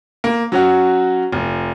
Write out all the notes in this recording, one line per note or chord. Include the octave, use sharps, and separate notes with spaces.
A#3
F#3 C#4 F#4
F1